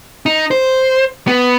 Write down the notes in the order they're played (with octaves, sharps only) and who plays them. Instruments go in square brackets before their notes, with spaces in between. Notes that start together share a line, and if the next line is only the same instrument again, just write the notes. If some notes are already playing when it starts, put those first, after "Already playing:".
[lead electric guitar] D#4
C5
B3